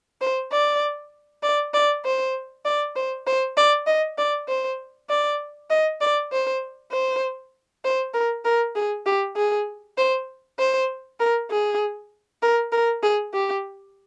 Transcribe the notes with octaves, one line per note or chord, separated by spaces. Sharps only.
C5
D5
D5
D5
C5
D5
C5
C5
D5
D#5
D5
C5
D5
D#5
D5
C5
C5
C5
A#4
A#4
G#4
G4
G#4
C5
C5
A#4
G#4
A#4
A#4
G#4
G4